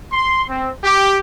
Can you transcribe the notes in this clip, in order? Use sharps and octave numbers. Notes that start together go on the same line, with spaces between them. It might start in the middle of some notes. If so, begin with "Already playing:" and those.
C6
C4
G4